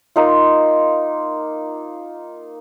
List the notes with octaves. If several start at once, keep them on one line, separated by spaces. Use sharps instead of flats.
A#3 D#4 F4